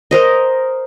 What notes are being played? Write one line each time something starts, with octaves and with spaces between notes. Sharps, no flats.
A#4 C5 D#5